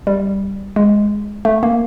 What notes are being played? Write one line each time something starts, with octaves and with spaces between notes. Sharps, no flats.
G3
G#3
A3
A#3